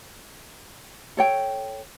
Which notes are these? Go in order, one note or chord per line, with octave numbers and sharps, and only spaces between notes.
A4 C#5 G5